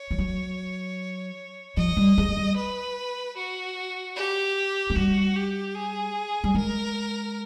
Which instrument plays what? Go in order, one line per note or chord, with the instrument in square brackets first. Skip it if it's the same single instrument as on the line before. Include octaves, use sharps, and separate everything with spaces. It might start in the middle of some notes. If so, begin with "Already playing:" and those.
Already playing: [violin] C#5
[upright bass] F3
F#3
[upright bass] F3 [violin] D#5
[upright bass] G3
G#3
G3
[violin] B4
F#4
G4
[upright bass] G#3
[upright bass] G3 [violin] F#4
[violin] G4
G#4
[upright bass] G3
[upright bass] G#3 [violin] A#4